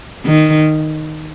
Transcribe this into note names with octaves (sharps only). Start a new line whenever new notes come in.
D#3